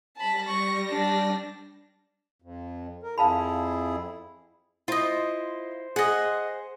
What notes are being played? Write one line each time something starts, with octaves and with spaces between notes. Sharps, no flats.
G3 A5 B5 A#6
C#6
D4
F2
A#4
F2 E4 G#4 F5 A5 B5
E4 F4 C5 D#5
G#4 D#5 F#5